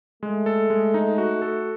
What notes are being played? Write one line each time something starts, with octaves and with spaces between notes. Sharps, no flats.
G#3 A3
A4
G#3
D#4
F#4
A4